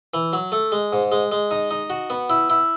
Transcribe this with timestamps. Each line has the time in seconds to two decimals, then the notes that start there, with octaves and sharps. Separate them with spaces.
0.14 E3
0.33 F#3
0.52 A3
0.72 G#3
0.93 G#2
1.12 G#3
1.32 G#3
1.51 D#4
1.71 D#4
1.90 F#4
2.10 B3
2.30 E4
2.50 E4